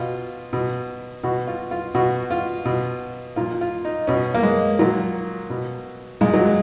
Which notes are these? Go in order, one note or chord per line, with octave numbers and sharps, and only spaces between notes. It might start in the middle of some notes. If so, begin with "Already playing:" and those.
Already playing: B2 F4
B2
B2 F#4
F4
F4
B2 F#4
F4
B2
A#2 F3 F4
F4
D#4
B2 C#4
A#3
G#3
A#2 F3 F#3
B2
A#2 F3 G#3
F#3
G#3